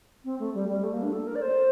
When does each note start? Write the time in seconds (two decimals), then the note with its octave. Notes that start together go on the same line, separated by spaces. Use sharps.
0.25 C4
0.40 A3
0.54 G3
0.69 G3
0.84 A3
0.93 A#3
1.02 D4
1.13 A4
1.27 A#4
1.36 D5
1.42 C5